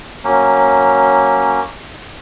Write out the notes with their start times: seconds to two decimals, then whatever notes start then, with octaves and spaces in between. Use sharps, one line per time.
0.24 F#3 A#3 C#4